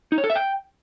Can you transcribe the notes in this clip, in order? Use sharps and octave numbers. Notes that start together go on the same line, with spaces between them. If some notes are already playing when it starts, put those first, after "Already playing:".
D#4
C#5
A4
E5
G5